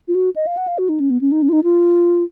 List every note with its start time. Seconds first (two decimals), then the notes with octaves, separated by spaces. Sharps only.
0.08 F4
0.15 F#4
0.36 D#5
0.47 F5
0.57 F#5
0.67 F5
0.78 F#4
0.89 D#4
1.00 C#4
1.10 B3
1.21 C#4
1.32 D#4
1.42 C#4
1.49 F4
1.53 D#4
1.64 F4